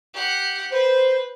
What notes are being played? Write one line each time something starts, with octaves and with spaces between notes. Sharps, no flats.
G4 F#5
B4 C5